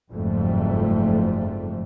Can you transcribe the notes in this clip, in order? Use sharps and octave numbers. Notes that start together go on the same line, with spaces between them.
F#1 F2 G#2 G3 A3